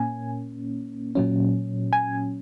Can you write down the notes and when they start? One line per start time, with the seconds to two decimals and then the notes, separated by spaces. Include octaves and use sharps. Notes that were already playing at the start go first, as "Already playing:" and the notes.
Already playing: A#2 A#3 C#4 G#5
1.15 A#2 F#3 C#4
1.93 G#5